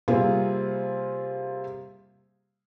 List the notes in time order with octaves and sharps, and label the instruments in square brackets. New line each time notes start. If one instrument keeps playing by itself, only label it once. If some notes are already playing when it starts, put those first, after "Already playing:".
[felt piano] C3 G3 A#3 C4 F4 G#4